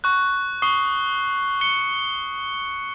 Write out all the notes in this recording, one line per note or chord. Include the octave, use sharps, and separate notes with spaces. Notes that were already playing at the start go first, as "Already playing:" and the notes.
C#6 F#6
C#6 D#6 C7 G7
C#7 G7